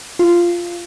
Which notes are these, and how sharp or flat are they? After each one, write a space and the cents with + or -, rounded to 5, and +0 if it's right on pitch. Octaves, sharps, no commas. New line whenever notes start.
F4 -10